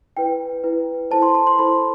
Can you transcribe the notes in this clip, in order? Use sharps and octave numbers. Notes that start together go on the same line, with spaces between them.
E4 B4 G5
E4 B4
E4 A4 C5 A5
C6
C6
C6
E4 A4 C5 B5